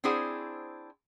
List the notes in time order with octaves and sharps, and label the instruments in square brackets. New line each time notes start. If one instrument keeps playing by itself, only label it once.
[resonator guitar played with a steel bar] C4 D4 E4 G#4 C5 F#5